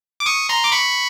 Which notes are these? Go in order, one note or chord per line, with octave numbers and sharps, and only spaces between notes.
D6
C#6 D#6
A#5 C6
D6
B5 C#6